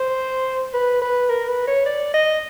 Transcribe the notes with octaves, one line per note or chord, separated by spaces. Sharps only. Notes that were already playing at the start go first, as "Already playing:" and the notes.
Already playing: C5
B4
B4
A#4
B4
C#5
D5
D#5